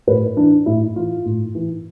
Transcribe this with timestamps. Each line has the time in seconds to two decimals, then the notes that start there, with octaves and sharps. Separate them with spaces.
0.07 A2 B4
0.37 E3 D4
0.66 A2 E4
0.96 E3 F4
1.25 A2
1.55 E3